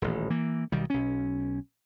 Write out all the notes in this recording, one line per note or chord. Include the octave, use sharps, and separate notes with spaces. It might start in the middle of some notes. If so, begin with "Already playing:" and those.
D#1 A1
E3 A#3
B1 D#3 G3
B1 C#4